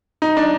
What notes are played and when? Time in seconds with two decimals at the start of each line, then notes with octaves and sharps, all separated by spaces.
0.22 D#4
0.37 D4